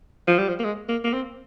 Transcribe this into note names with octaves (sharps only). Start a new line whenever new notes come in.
F3
G3
F3
A#3
G#3
A#3
A#3
C4